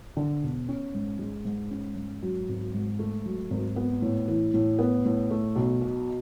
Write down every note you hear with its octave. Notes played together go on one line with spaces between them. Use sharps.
D3
E1
C#4
G#2
G#3
G#2
C#4
G#2
F#3
G#1
G#2
A3
F#3
G#1
B3
A2
E3
A2
B3
A2
A3
B1
B2